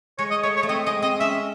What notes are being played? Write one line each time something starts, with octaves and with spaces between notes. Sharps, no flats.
G#3 C#5
D#5
A3 C#5
C#5
A3
C4 D#5
G#3 D#5
C4 D#5
C#4 E5